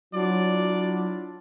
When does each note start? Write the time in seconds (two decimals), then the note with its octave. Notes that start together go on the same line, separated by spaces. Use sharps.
0.14 F#3 D4 E4 F4 D5